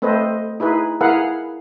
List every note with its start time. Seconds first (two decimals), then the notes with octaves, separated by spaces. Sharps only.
0.02 A3 C4 A4 B4 C5 D#5
0.60 D#4 E4 G#4 B4
1.01 E4 G#4 A#4 B4 F5 F#5